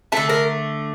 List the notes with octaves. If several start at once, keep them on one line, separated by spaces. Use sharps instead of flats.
D3 A3 A4
A#4